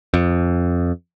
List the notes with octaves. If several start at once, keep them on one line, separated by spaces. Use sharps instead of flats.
F2